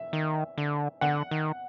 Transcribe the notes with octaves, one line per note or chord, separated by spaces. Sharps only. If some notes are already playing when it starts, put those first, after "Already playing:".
Already playing: E5
D#3
D3
D3 F#5
D#3